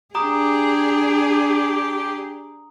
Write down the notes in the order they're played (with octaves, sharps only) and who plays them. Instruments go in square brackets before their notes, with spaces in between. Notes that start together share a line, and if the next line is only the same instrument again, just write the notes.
[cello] D4 G#4 [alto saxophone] G4 [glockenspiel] A#5 D#6